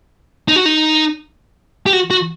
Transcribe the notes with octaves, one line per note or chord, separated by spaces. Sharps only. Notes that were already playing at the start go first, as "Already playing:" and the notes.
D#4
F#4
D#4
G4
F#4
F#4